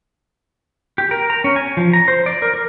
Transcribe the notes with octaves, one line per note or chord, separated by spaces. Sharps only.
G4
A#4
A#5
C#4
G#5
F3
A#5
C5
D5
A#4
A#4